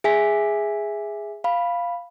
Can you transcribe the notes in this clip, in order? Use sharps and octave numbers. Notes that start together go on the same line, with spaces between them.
G#4 E5 G#5 B6
F5 B5